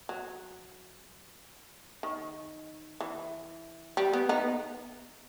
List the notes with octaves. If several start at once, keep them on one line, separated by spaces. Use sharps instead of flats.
F#3
D#3
E3
G3
B3
B3 D#4